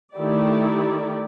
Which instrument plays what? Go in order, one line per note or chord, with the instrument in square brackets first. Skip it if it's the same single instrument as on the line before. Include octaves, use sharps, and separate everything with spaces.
[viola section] D#3 A3 E4 G4 D5